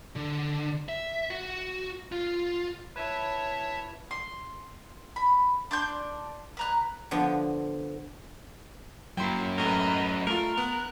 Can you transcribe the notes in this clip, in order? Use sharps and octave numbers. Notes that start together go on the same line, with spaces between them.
D3
E5
F#4
F4
E4 B4 C#5 E5 A5
C6
B5
D4 C6 G6
B4 A#5 F#6
D3 F3 B3
F#2 F#3 A#3 E4 G5 C6
A2 A3 A#4 B4 D#5
A3 F4 A#4
B3 F#6